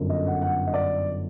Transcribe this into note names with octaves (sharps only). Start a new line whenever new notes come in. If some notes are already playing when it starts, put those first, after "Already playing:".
Already playing: G1 F#2 D3
D#5
F#5
F#5
D#5
D5